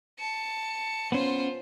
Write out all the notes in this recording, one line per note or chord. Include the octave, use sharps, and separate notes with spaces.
A5 C#7
B3 C#4 F4 C5